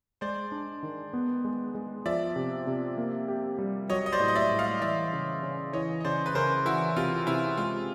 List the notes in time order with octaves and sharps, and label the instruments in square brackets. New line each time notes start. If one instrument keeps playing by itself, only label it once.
[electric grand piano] G#3 [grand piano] C5 D5
[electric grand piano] D4
D#3
B3
G#3
G#3
[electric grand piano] F3 [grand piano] D5 E5
[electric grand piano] C3
C3
A#3
G4
G3
[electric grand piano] F#3 [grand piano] C#5 D#5
[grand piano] D#5
C5 D5
[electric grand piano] A2
[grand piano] D#5
D5 E5
[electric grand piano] A2
[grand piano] D#5 F5
[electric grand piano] E3 [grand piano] D5 E5
[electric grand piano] C#3
C#3
[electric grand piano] E3 [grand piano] C#5 D#5
[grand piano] D#5
[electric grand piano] C#3 [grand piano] C5 D5
[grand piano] B4
[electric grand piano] C#3 [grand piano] A#4 C5
[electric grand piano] E3 [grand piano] E4 F#4
[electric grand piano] C3 [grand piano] F4
[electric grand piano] C3 [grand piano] E4
[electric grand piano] G#3 [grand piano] F4